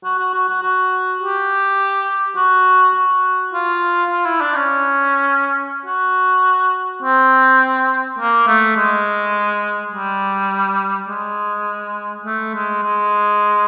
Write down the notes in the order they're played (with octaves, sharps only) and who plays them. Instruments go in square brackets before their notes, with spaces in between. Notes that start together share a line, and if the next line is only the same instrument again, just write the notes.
[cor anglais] F#4
F#4
F#4
F#4
F#4
G4
F#4
F#4
F4
F4
E4
D4
C#4
F#4
C4
A#3
A3
G#3
G3
G#3
A3
G#3
G#3